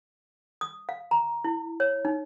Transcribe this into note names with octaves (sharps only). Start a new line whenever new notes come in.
D#6
F5
A#5
E4
C#5
D#4